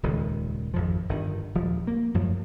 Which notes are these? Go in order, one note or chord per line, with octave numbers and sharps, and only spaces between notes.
D#1 C#2 D#3
G#1 F2 F3
G1 D3 D#3
D#1 F3
A#3
F#2 A2 F3 F#3